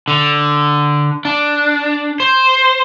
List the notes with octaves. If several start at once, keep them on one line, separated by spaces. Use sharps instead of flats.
D3
D4
C5